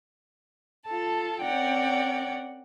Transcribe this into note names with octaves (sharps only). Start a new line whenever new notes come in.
F4 A4 A5
C4 C#4 A#4 D5 F#5 G5